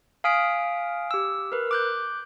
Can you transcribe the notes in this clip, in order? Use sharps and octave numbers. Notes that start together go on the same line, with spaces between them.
F5 G#5 D#6 F6 B6 D7
G4 E6
A#4 B4
D6 F#6 G6